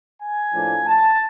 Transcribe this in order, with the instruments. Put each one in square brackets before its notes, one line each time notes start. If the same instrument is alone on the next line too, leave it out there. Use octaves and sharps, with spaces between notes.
[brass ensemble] G#5
A2 F3 A#3 D4
A5